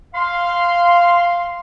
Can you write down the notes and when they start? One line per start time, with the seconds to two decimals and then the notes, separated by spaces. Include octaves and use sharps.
0.14 F5 C6